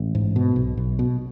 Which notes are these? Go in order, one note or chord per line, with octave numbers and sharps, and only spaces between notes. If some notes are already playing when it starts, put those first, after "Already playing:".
Already playing: A1
G#2
B2
B1
B1
B2